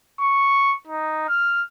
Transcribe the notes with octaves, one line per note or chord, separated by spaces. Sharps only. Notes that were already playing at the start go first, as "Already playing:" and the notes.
C#6
D#4
F6